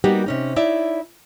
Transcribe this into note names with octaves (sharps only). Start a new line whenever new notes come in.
G3 A#3 B3 D#4 F#4 G4
C3 C#4 D#4
D#4 E4 C#5 D5 E5